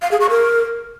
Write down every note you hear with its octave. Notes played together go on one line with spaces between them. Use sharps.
F5
G#4
C#6
A#4